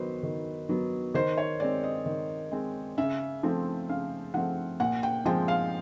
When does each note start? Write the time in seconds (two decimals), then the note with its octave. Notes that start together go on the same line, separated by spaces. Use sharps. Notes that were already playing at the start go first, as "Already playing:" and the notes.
Already playing: D#3 F#3 B3 B4 C5
0.23 D#3
0.69 F#3 B3
1.14 D#3 C5
1.37 C#5
1.60 G#3 C4 D5
1.83 D#5
2.06 D#3
2.51 G#3 C4
2.98 C#3 E5
3.43 F3 A3 C4
3.89 C#3 F5
4.34 F3 A3 C4 F#5
4.80 A#2 F#5
5.03 G5
5.25 F3 G#3 C4 G5
5.48 F5